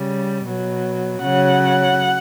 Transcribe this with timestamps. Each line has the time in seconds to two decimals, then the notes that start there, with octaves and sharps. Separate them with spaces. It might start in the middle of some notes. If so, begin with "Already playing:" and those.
Already playing: C#3 G3
0.46 B2 F#3
1.22 C#3 F#3 F#5